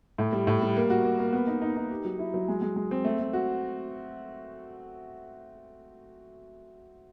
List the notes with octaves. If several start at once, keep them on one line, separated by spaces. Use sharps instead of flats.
A2
G3
A2
G3
A#3
F#4
A#3
A#3
B3
D#4
D#4
D#4
G4
F#3
E4
F#3
G#3
G#3
G#3
C4
A3
A3
F#4